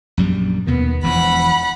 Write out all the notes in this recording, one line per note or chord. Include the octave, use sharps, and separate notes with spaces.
A#1 F#2 G3
D#2 B2 D#3 B3
E1 E3 F3 F#5 B5